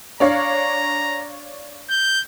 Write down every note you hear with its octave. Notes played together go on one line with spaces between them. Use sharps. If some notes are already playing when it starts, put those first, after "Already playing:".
D4 C#5 F5 A#5
G6